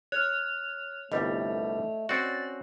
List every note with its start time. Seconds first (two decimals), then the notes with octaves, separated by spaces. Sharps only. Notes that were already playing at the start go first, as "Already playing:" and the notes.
0.12 C#5 F6 F#6
1.12 G1 C2 G3 A3 D#5
2.09 C4 C#4 F#4 D5